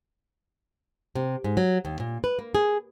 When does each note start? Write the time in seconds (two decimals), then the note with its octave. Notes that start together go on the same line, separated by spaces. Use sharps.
1.15 C3
1.44 G#2
1.57 F#3
1.85 D#2
2.00 A#2
2.24 B4
2.39 A#3
2.55 G#4